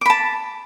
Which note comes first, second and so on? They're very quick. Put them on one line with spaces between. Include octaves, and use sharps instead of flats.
D6 B5 A5